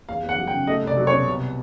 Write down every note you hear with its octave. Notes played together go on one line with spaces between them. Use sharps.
E2 F5
E2
F#5
F#3
G5
C#3
A3 D#5
C2 D5
F#3
C#5
B2
C2